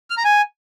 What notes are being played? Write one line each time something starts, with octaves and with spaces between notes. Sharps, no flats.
F6
A#5
G#5